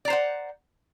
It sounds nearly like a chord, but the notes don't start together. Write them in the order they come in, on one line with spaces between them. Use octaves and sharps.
D5 A#5 C5 F#5